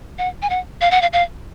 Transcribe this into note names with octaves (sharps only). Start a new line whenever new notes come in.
F#5
G#5
F#5
F5
F#5
F5
F5